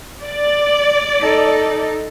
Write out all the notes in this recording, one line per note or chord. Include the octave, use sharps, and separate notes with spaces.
D5
D#4 A4